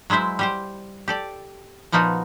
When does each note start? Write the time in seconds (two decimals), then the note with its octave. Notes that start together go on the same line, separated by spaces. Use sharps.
0.10 F#3 G#3 E4 C5 E5
0.39 G3 G4 C5
1.08 G4 A4 D5
1.92 A#2 F3 B3 D#4 F4 F#4